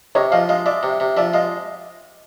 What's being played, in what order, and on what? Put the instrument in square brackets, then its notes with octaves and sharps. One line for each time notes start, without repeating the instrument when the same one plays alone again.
[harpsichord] C3 [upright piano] C#5 D#5
[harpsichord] F3 [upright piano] D#5 F5
[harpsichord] G#3 [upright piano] D#5 F5
[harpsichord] G#3 [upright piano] D5 E5
[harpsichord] C3
C3
[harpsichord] F3 [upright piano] D5 E5
[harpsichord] G#3 [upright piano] D#5 F5